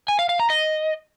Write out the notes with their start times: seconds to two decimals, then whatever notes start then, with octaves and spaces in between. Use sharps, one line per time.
0.08 G#5
0.19 F5
0.29 F5
0.40 A#5
0.50 D#5